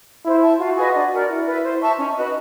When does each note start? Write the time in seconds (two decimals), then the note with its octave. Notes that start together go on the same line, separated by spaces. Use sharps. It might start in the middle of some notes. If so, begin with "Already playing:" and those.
0.25 E4 C5
0.42 E5 A5
0.60 F4 F#4
0.77 G#4 B4 D#5
0.95 D4
1.12 F#4 A#4 D5
1.29 E4 F#4
1.47 B4 E5
1.64 C5
1.81 E5 A5 C#6
1.99 C#4 D#4
2.17 F#4 B4 D#5